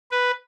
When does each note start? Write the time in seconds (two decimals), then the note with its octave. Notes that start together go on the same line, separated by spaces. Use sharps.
0.12 B4